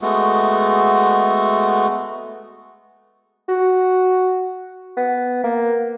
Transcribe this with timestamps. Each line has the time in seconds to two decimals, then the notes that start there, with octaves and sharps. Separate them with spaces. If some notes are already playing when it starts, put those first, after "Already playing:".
0.01 G#3 A3 B3 F#4
3.49 F#4
4.97 B3
5.44 A#3